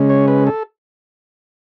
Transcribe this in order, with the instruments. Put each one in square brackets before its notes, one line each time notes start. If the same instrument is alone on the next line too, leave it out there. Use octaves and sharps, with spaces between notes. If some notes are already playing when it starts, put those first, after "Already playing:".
Already playing: [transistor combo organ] C#3 G#3 C#4
C#5
B4
A4